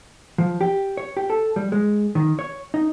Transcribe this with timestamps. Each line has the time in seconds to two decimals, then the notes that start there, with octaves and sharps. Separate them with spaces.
0.38 F3
0.61 G4
0.97 C#5
1.17 G4
1.30 A4
1.56 G3
1.72 G#3
2.15 D#3
2.39 C#5
2.74 D#4